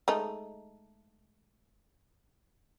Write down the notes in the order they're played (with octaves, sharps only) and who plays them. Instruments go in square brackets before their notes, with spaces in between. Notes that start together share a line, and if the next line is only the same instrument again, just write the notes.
[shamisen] G#3 A3 D#4